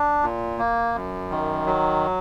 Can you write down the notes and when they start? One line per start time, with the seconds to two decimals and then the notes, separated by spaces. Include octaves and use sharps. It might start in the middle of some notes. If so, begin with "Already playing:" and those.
Already playing: D4
0.23 A#2
0.58 A#3
0.95 F#2
1.30 D#3
1.66 F#3